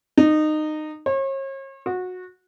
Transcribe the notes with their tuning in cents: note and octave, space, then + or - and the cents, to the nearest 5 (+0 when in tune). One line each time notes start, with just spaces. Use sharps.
D#4 -20
C#5 -40
F#4 -20